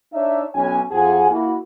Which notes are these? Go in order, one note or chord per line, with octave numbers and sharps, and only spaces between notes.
D4 D#4 C#5 E5
B1 C#4 G#5
F2 F3 F4 G#4 F#5 G#5
A#3 E4 F#4